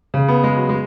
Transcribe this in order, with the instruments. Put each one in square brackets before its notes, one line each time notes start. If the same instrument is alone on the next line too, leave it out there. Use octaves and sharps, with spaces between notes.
[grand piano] C#3
B3
G#3
F#3
G#3